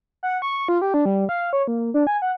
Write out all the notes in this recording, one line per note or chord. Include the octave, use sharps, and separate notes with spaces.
F#5
C#6
F4
G4
D4
G3
F5
C#5
A#3
D4
G#5
F#5